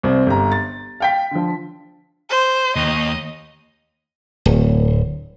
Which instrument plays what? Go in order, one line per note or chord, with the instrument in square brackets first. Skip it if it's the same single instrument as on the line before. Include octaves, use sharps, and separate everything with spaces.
[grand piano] C2 C4
G1 G4 A#5
A6
F5 G5 B6
D3 F3
[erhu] C5
[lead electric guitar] D#2 [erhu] D#5
[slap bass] D1